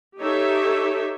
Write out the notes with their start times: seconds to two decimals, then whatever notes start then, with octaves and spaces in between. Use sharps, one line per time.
0.20 D#4 G4 A4 C#5 E5